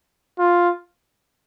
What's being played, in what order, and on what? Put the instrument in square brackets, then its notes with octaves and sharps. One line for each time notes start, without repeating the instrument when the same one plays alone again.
[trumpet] F4